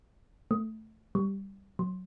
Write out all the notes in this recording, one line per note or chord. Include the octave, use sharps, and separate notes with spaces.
A3
G3
F#3